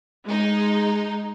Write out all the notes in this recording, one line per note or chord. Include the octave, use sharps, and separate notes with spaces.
G#3 D#4